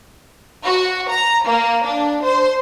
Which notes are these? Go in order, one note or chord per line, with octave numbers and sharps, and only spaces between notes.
F#4
A#5
A#3
D4
C5